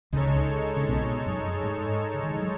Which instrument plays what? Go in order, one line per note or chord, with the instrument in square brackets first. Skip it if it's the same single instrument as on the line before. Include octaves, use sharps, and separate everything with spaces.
[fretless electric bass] C#2 C#3 [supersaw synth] G#3 D#4 A4 C#5
[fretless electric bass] C#3
B1 B2
F#2 F#3
G#2 G#3
C#3
D#3
E3
F#3